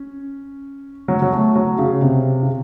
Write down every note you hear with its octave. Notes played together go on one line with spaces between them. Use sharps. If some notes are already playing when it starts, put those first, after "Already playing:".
Already playing: C#4
F#3
F#3
A3
F#3
C#3
C3
C#3